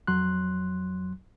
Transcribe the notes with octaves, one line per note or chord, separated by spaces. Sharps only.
F2 F#3 C6 F#6